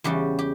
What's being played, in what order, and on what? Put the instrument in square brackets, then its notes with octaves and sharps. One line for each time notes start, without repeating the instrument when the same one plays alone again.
[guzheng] E2 C#3 G3 G4
G4